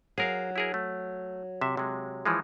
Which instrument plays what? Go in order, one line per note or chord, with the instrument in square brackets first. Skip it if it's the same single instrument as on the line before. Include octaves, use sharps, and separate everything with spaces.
[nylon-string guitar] F#3 [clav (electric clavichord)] G#4 A#4 F5
[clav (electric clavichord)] E4 G#4 A#4
A3
C3 E5
C3 G#3
E3 F3 G#3